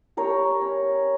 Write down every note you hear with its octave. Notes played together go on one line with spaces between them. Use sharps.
G3 A#4 C#5
C#4